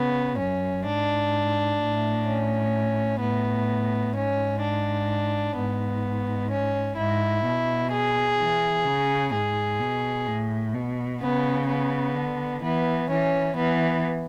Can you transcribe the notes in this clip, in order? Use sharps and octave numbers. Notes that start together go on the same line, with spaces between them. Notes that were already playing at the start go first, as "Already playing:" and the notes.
Already playing: C#3 B3
F#2 C#4
G#2 D4
A2
C#4
A2 B3
G#2 C#4
D4
G#2 B3
C#4
G#2 E4
B2
G#4
E3
C#3
G#2 G#4
B2
A2
B2
C#3 B3
B3
D3
E3 B3
E3 C#4
E3 B3